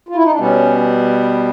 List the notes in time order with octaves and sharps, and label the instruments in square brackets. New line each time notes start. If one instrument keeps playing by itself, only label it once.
[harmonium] F4
E4
D#4
D4
[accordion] B2 G3 B3 [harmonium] C#4